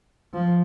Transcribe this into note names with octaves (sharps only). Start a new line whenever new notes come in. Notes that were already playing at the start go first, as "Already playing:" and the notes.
F3